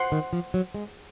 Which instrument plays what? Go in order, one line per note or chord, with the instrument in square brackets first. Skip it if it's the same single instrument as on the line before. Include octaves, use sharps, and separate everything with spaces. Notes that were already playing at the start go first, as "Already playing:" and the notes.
Already playing: [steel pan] C5 F#5 C6
[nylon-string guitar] D#3
F3
F#3
G#3